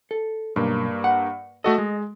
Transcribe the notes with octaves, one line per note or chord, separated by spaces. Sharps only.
A4
B1 G2 A#3
F#5
A3 F#4 A4 D#5
G#3